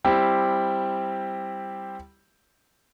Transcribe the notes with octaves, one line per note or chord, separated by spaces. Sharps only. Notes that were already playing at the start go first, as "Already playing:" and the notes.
G3 C4 E4 G4